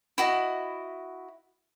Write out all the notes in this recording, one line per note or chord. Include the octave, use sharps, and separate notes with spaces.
E4 F#4 D#5